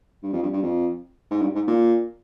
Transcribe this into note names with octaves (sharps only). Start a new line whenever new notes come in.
G2
F2
G2
G2
F2
G#2
G2
G#2
A#2